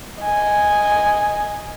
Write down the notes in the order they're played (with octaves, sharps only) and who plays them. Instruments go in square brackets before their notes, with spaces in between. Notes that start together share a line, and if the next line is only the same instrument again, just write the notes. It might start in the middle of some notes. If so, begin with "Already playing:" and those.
[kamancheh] D#5 G#5